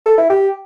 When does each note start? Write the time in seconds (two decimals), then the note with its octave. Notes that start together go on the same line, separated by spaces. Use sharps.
0.06 A4
0.18 E4
0.30 G4